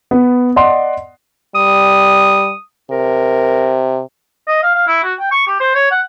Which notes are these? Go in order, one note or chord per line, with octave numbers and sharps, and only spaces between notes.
B3
D5 D#5 F#5 C6
G3 D#6
C3 A#4
D#5
F5
F5
E4
F#4
G5
C#6
G4
C5
C#5
F#5